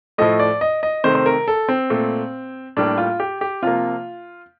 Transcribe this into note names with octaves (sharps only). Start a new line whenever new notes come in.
A2 F3 A3 D#5
D5
D#5
D#5
C3 D#3 A3 C5
C5
A#4
A4
C4
A#2 A3
A2 G3 A#3 D4
F4
G4
G4
C3 F3 A#3 F4